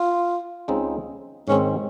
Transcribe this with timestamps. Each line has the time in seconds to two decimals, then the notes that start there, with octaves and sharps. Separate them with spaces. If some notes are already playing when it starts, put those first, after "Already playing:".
Already playing: F4
0.68 C#2 C#3 G#3 C4 D#4
1.48 G#2 D#3 G#3 C4 C#4